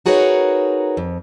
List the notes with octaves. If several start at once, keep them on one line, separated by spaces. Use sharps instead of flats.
D#4 F#4 G#4 A#4 B4 C#5
F2